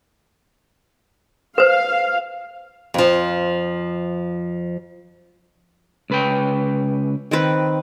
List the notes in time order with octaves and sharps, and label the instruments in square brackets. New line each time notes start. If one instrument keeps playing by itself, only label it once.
[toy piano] B4 C5 [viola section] F5
[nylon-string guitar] F2 F3
[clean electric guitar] C#2 B4 G5
[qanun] D#3 C4 B4